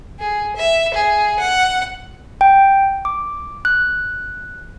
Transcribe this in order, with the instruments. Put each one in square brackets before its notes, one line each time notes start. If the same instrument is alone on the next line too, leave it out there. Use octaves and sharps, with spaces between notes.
[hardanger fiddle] G#4
E5
G#4
F#5
[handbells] G5
D6
F#6